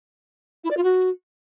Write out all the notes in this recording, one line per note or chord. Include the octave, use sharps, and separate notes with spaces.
E4
D5
F4
F#4